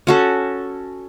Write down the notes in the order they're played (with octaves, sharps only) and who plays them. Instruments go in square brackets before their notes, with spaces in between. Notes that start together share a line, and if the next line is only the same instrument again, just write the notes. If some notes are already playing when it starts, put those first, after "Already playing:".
[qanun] C#4 F#4 A4